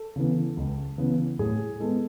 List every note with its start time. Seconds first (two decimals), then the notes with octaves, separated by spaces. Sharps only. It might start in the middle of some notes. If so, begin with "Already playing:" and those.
Already playing: A4
0.16 C#3 E3 B3
0.57 C#2
0.98 C#3 E3 B3
1.39 A2 G#4
1.80 G#3 B3 A4